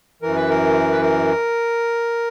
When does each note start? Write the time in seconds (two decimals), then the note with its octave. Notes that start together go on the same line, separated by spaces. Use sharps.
0.22 F#2 E3 A#4
0.36 B4
0.50 A#4
0.91 B4
1.02 A#4